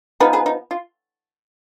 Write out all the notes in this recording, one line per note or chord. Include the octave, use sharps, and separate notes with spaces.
F3 B3 D#4 G#4 B4
G#4 B4
D#4
F4